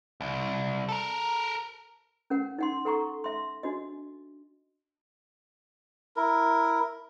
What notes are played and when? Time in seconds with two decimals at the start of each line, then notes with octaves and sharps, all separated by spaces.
0.21 C2
0.89 A4 A#4
2.30 C#4 A#4 F#5
2.59 D#4 F#5 C6
2.85 A4 F#5 A#5 C#6
3.24 E5 C6
3.63 D4 F#4 D#5
6.16 E4 A#4